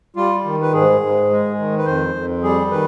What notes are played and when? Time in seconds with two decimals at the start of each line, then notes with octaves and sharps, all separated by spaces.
0.16 G3 F4
0.45 D#3
0.62 B4
0.73 G#2 G#4
1.01 G#2
1.30 G#3
1.58 D#3
1.78 B4
1.86 F2 C5
2.15 F2
2.43 G3 G#4
2.71 D#3 B4